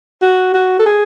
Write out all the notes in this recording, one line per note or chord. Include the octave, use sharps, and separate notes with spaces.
F#4
F#4
A4
G#4